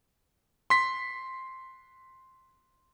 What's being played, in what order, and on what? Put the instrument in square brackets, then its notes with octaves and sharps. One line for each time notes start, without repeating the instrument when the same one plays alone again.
[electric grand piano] C6 B6